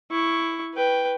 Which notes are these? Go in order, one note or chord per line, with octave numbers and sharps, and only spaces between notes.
E4 C#6
B4 G5